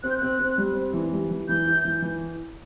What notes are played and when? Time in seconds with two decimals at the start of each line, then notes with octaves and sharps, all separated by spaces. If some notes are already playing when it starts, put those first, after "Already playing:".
0.03 C4 F#6
0.10 G6
0.17 F#6
0.22 C4
0.39 C4
0.58 G3
0.75 C4
0.93 E3
1.13 G3
1.31 E3
1.49 E3 G6
1.66 E4
1.85 E3
2.02 E3